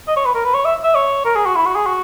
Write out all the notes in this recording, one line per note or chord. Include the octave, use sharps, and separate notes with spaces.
D#5
C#5
B4
A#4
B4
C#5
E5
E5
C#5
A#4
G#4
F#4
E4
F#4
G#4
F#4